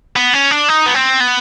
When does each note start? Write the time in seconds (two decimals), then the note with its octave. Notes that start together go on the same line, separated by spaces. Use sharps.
0.16 B3
0.33 C#4
0.51 D4
0.68 D#4
0.86 B3
0.94 C4
1.20 B3